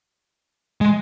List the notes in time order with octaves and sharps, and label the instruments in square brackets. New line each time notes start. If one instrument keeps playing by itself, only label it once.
[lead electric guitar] G#3